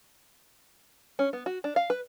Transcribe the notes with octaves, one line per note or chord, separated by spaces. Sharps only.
C#4
B3
F#4
D4
F5
B4